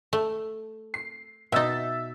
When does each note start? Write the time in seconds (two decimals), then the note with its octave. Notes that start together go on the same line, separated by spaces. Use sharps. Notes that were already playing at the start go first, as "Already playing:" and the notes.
0.13 A3
0.94 C7
1.52 B2 D#4 E5 E6 A6